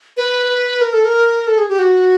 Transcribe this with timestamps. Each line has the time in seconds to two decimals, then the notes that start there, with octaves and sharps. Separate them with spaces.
0.17 B4
0.81 A#4
0.93 A4
1.05 A#4
1.47 A4
1.58 G#4
1.69 G4
1.79 F#4